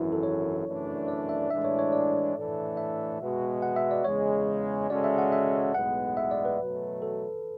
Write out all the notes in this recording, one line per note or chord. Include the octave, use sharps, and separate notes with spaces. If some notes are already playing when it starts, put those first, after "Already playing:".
Already playing: G#1 F#2 E3 E4
A4
C#5
F#2 E3 A3 D4
D5
E5
A2 E3 G#3 D4 E5
C#5
C#5
D5
A2 E3 A3 D4 A4
E5
B2 G#3 B3 F#4
F#5
E5
D5
E2 C#3 G#3 C#5
C#3 G#3 C#4 F#4 A4 D5
E5
F#5
E5
B1 A2 G#3 B3 F#5
E5
D5
B4
B2 F#3 A3
A4